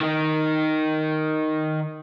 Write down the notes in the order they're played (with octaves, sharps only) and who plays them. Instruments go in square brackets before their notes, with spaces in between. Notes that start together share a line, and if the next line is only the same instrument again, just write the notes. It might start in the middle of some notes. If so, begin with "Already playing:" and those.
[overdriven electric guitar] D#3 D#4